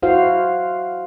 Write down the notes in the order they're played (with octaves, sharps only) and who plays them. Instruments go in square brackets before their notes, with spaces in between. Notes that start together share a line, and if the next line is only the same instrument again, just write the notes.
[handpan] E4 F#4 C5 F5